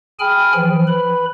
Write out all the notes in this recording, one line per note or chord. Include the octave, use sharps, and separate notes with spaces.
G#4 G5 G#5 B5 F6
E3 F3
B4 B5